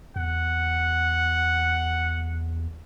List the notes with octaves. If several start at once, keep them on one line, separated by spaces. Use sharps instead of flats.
E2 F#5